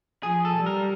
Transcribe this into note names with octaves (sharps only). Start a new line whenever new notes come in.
F3 G#4
A4
G3
A#4